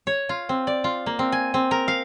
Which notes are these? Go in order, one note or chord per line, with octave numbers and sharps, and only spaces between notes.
C#5
F4
C4
D5
F4
A#3
C4
G#5
C4
A#4
F5